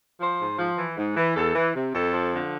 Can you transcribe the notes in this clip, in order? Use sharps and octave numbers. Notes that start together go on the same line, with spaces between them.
F3 C5
G#2
F3
E3
G#2
E3
E2 A4
E3
C3
F2 A4
F3
D3